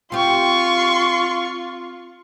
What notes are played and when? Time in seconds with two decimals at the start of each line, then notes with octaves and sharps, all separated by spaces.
0.12 C4 F4 G4 C6 C#6